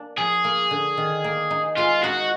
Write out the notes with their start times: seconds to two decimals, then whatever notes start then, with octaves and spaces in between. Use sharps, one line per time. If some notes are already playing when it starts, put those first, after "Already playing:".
Already playing: A#3 D4
0.18 F3 G#4
0.44 A#3
0.71 D3
0.97 D#3
1.24 A#3
1.51 D#4
1.77 G#3 F4
2.04 D#4 F#4